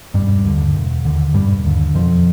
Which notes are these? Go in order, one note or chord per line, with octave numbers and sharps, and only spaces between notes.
E1 G2 G3
D#2 D3
E1
D#2 D3
E1 G2 G3
D#2 D3
E1 F2 F3